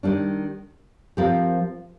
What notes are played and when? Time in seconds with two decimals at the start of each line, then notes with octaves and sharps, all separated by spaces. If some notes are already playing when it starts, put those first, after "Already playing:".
0.03 D#3 G3 D4
1.17 F3 C4 G4 A#4